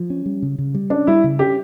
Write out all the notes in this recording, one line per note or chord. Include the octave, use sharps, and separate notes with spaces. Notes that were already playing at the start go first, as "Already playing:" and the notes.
Already playing: F3
C#4
G3
C#3
C#3
G3
C#4 D4
G3 E4
C#3
C#4 G4